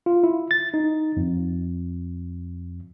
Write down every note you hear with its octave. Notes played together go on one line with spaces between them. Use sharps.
F4
E4
A6
D#4
F2